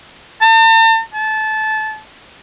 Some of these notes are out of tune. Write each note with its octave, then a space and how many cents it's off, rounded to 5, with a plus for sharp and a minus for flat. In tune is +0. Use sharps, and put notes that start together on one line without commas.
A5 +40
A5 -20